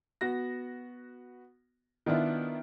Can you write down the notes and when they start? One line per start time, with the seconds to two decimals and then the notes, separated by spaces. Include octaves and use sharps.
0.21 B3 F#4 A#6
2.06 D#3 B3 D4 E4 F4